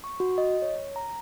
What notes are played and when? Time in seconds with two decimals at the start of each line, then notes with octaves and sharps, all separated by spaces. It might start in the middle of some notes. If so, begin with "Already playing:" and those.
0.04 C#6
0.20 F#4
0.38 D#5
0.62 C#5
0.96 A#5